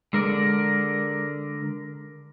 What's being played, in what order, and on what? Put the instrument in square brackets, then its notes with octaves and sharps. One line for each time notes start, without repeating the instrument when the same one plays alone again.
[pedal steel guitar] D3 A#4 D5 [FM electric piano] G#3